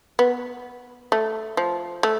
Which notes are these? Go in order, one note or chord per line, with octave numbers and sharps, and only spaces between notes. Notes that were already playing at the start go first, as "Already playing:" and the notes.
B3
A3
F3
A3